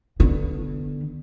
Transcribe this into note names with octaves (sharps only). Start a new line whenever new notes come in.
D3 B3